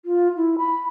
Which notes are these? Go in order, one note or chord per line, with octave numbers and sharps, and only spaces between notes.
F4
E4
B5